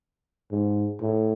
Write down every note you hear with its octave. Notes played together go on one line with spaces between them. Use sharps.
G#2
A2